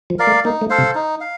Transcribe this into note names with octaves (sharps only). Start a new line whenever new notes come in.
F3
A#4 D5 F5
A3
A#3 D#4
A3
A4 C5 F5
C3
D#4
F5